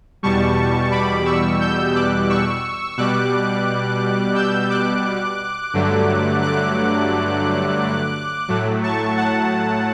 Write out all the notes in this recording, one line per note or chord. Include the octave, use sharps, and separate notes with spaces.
E2 B2 G3 A5 C#6
B5 D6
C#6 E6
E6 G6
D6 F#6
C#6 E6
B2 G3 D6 F#6
E6 G6
D6 F#6
G2 D3 F#3 A3
D6 F#6
A2 F#3 A3
A5 C#6
F#5 A5